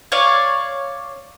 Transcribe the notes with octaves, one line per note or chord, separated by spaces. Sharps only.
C#5 D5 F5